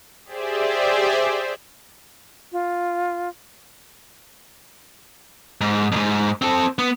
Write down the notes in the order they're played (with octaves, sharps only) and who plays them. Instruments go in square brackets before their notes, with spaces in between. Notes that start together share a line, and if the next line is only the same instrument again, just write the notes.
[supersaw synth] G4 G#4 C5 D5 E5
[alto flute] F4
[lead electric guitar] G#2
F2 G#2
C4 A4
B3